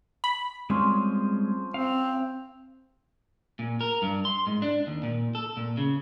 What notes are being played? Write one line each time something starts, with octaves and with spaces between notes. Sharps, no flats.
B5
F3 G3 G#3 C4 C#4 C5
C4 F5
A#2
A#4
G2
C6
G#2
D4
D#2
A#2
A4
A#2
C#3